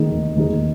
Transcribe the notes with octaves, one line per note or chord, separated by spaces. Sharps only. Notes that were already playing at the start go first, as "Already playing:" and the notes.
Already playing: D#3 A#3 D#4 G#4
D#2
D#3 A#3 D#4 G#4